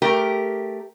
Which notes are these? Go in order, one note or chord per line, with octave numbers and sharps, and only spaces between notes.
A3 G4 A#4